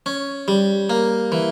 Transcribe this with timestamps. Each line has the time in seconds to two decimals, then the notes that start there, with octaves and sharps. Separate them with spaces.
0.06 C#4
0.48 G3
0.90 A#3
1.32 E3